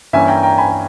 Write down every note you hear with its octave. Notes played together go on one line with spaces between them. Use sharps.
G2 E3 A#3 C#4 E5 G#5
G5 A#5
G5 A#5
G#5 B5